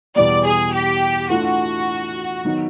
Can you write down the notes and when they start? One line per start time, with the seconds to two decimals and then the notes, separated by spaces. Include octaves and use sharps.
0.15 E2 B2 G3 B3 D5
0.44 G#4
0.73 G4
1.30 E3 A3 D4 F4 F#4
2.44 D#3 F#3 B3 D#4